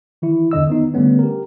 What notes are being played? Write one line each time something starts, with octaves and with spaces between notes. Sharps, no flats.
D#3 E3 E4
E2 D3 D#5 E6
D#3 B3 D#4
D3 G3 A3 B3 C#4
G4 A#4